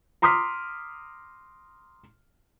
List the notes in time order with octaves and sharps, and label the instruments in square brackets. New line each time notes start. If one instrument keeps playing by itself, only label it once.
[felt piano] A#5 C6 D6 D#6 F6 B6